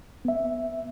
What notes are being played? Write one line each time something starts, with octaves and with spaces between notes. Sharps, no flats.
B3 E5